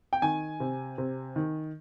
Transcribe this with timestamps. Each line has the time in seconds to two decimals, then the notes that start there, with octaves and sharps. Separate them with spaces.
0.13 G5
0.22 D#3 G#5
0.60 C3
0.98 C3
1.36 D#3